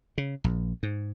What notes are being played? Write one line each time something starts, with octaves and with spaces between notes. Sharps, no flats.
C#3
A#1
G#2